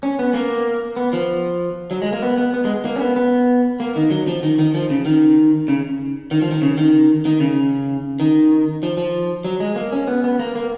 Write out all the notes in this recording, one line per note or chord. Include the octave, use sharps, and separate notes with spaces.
C#4
B3
A#3
B3
F3
F#3
G#3
A#3
B3
B3
B3
G#3
A#3
C#4
B3
B3
A#3
D#3
F#3
F3
D#3
D#3
F3
C#3
D#3
C#3
D#3
F3
D#3
C#3
D#3
D#3
C#3
D#3
F3
F3
F#3
G#3
A#3
C#4
B3
B3
A#3
A#3